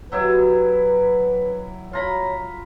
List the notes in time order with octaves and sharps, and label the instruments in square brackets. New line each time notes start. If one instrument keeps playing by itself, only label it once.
[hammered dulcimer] F#3 E4 G4 [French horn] B4
[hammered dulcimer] F4 A#5 B5 [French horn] C#5